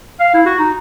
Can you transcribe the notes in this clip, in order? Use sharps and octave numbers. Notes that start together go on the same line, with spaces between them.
F5
E4
F#4
D#4